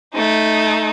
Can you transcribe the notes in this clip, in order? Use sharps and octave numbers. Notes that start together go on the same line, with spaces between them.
A3 D#4